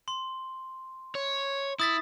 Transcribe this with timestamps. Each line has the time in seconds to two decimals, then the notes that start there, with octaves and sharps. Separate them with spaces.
0.08 C6
1.15 C#5
1.80 E4 D#6 A6 B6